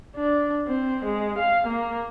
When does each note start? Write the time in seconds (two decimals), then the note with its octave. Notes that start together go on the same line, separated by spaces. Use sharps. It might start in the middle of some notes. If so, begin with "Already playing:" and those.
0.17 D4
0.68 C4
1.05 G#3
1.38 F5
1.67 A#3